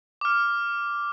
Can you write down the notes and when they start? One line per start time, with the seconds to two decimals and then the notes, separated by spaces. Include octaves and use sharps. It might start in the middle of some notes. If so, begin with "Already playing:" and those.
0.21 D6 F6